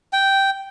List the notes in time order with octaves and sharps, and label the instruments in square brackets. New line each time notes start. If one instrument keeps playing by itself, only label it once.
[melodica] G5